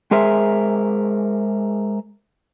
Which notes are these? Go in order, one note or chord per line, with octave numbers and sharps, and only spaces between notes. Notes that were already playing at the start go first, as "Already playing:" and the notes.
G#3 G#4 A#4 C5 E5